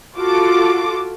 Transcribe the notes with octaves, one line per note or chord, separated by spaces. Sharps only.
F4 F#4 A4 D6